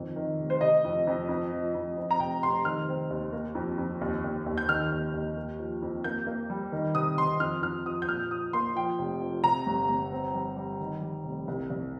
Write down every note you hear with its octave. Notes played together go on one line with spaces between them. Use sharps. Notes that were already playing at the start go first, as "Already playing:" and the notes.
Already playing: F2 D#3
D#3
F1
C5
C3 D#5
F2
F2
F2
F3
F2
F2
A#5
F1 G5
F1 C6
D#3 F6
C4
D#2
A#3
F2
F2
D#2
D#2
D#2
G6
D#3 F6
D#2
D#2
A#3
F3
F2
A#3 G6
A#3
G3
D#3
C3 D#6
C3 C6
F2 F6
F2 F6
F3 D#6
G6
A#2 F6
F3 D#6
A#3 C6
F3 G5
F1
F3
C3 A#5
G1
G1
C4
G3
G3
D#3
G3
F1
C2
C2